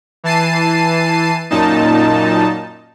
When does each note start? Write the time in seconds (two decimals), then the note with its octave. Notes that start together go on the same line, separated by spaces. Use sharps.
0.24 E3 A5 C7 D#7
1.50 F#2 A#2 D#4 A5